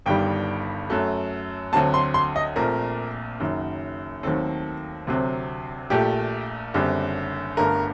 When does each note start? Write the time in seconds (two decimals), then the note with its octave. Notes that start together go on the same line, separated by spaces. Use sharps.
0.06 G1 G2 D#3 G3 G5
0.90 F#2 F#3 A3
1.73 D2 D3 F#3 C4 A5
1.94 C6
2.14 C6
2.36 D#5
2.56 A#1 A#2 A3 C4 A#4
3.40 F#1 F#2 D#3 F#3
4.23 D#2 D#3 F#3 A3 C4 A4
5.07 D2 C3 F#3 C4
5.90 A#1 A#2 A3 G4
6.74 F#1 F#2 D3 G3 C4
7.57 G1 G2 D3 A3 A#4